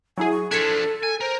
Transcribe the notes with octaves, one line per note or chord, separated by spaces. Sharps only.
F#3 E4 G#4 G#5
C#6
F3 D4 A4 G#6 B6 C#7
G#5
A#4 C5